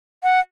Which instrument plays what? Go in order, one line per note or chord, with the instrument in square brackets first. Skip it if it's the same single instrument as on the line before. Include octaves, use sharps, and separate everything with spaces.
[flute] F#5